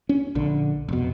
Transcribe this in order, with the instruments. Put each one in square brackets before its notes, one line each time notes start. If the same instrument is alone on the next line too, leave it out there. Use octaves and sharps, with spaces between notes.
[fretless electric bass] C#4
A#1 D3
F1 B2